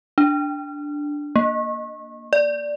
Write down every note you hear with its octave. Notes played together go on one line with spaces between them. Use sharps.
D4
A#3
D5